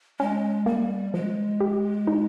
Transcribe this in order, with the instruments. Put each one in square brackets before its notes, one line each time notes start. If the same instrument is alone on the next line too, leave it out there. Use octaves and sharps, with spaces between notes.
[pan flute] G#3 [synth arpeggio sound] C#4
[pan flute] G3 [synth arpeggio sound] A#3
[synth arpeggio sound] F3 [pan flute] G#3
[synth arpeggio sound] G4
D#4